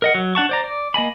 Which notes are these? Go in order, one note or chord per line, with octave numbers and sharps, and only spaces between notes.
A#4 D#5 F#5
F#3
D4 F#5 A5 C#6
C5 D5 A#5
D5
A#3 D#5 G#5 B5